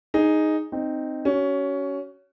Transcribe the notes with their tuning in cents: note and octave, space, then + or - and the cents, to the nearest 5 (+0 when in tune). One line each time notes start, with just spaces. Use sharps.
D#4 +0 G#4 +0
C4 +0 D#4 -10
C#4 +15 F#4 +30